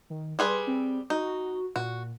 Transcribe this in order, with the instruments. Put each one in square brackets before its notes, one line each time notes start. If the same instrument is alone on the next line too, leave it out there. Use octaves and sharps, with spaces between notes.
[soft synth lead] D#3
[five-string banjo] G3 G#4 B4 [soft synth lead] C6
[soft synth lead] C4
[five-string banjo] D#4 [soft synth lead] F#4
[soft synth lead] A#2 [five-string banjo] F#4